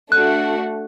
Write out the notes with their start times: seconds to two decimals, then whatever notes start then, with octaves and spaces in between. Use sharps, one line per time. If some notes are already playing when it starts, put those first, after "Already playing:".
0.11 A3 D4 F#4 F#6